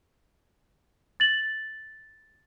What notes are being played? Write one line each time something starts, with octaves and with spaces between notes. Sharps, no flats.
A6 F#7